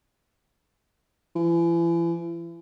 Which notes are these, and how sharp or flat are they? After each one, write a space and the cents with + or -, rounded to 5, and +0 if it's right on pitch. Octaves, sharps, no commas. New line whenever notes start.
E3 +40